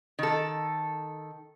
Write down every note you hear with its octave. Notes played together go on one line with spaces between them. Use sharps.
D#3 A4